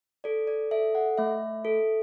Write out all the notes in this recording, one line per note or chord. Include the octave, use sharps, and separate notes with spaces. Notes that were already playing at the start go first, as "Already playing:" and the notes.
A4 D5
D5
A4 E5
F#5
A3 E5
A4